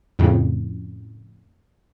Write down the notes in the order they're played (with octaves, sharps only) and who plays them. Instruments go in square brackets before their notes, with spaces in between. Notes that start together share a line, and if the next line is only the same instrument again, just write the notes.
[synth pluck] F2 A2 C#3